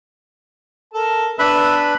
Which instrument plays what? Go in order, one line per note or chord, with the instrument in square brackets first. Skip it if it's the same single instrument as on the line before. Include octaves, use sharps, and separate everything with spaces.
[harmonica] A4 A#4 A5
[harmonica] B3 E5 [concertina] D4 B4 B5